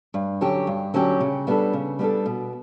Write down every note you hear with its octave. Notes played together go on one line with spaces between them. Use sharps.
G2
D3 F#3 C#4 G4
G2
D3 F#3 C#4 G4
C#3
G3 B3 D4 A4
C#3
G3 B3 D4 A4
B2